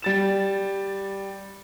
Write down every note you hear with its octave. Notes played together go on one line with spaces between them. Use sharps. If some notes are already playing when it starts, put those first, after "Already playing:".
G3 A6 E7